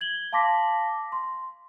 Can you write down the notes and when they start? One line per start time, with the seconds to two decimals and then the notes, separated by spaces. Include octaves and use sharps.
0.01 G#6 F#7 G7
0.32 F5 A5 C6 D6 A#6 B6
1.12 C6